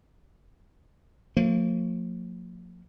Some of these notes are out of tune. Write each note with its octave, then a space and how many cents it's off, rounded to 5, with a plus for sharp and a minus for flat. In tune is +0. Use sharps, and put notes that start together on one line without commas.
F3 +35 A#3 -40